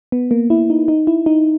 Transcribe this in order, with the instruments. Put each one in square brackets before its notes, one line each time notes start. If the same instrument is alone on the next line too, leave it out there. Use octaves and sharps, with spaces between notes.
[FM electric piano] B3
A#3
E4
D#4
D#4
E4
D#4